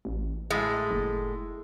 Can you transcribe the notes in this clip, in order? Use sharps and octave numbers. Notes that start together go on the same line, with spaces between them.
A1
A2 G#3
F#1